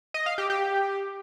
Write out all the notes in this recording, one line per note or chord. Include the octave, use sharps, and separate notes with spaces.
D#5
F5
G4
G4